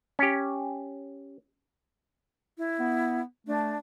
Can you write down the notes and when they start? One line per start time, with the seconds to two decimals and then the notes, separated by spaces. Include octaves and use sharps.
0.19 C#4 G4
2.58 E4
2.80 B3
3.47 A3 D4